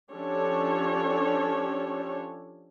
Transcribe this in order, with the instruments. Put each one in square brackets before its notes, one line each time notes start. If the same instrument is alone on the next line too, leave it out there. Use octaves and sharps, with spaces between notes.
[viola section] F3 C#4 D4 G4 A4 C#5